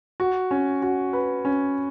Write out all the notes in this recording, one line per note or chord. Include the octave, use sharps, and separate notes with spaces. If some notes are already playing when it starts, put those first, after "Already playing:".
F#4
C#4
F#4
B4
C#4